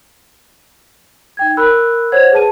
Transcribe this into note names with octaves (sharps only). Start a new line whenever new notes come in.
D#4 G5 G#6
A#4 B5 E6 F#6
C5 C#5 F#5 G#6
G#4 B4 A5 D#7